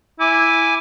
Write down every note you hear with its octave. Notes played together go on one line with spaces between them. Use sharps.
E4 G#5 D6